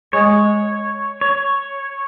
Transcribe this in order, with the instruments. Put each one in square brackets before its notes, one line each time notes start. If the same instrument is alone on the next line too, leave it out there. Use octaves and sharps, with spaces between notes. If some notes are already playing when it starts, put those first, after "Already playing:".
[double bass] G#3 [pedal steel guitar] C#5
[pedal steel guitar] C#5